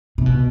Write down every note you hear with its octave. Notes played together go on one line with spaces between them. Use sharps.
C3
B2